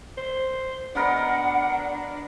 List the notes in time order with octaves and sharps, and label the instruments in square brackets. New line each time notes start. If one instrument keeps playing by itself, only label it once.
[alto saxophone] C5
[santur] B3 A#4 D#5 [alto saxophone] D4 [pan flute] F#5